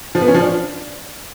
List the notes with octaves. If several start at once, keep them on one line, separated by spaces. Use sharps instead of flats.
F3
B3
C#4
F3
D4